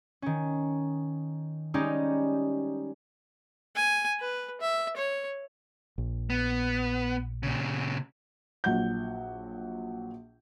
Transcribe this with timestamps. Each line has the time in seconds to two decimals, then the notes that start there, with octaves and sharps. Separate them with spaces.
0.22 D#3 C#4
1.74 G3 G#3 C#4 D#4 G4
3.76 G#5
4.20 B4
4.61 E5
4.97 C#5
5.98 A#1
6.30 B3
7.43 A#2 C#3
8.64 A#1 F#3 F#5 G6